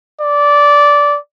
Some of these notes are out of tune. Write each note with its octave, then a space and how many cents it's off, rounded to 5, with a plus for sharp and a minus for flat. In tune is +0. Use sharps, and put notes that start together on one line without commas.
D5 -15